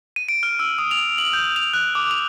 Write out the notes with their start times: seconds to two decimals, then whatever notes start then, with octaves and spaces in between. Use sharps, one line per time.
0.16 D#7
0.29 D7
0.43 F6
0.59 E6
0.78 D#6
0.91 F7
1.18 F#7
1.33 G6
1.56 F7
1.74 F#6
1.95 D6
2.11 F7